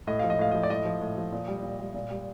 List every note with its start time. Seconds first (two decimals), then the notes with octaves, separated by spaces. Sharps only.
0.07 A2 D#5
0.19 F3 F5
0.30 D#5
0.39 A2 F5
0.51 F3 D#5
0.63 D5
0.70 A2 D#5
0.85 F3
1.01 A2
1.17 F3
1.32 A#2
1.48 G3
1.63 A#2
1.79 G3
1.94 A#2
2.10 G3